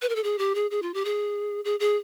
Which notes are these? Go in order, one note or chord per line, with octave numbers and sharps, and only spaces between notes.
B4
A#4
A4
G#4
G4
G#4
G#4
F4
G4
G#4
G#4
G#4